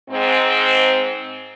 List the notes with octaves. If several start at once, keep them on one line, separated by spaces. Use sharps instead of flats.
G#2 C4